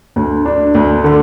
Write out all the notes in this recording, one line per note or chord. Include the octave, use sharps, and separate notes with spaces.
D2
D4
D2
D3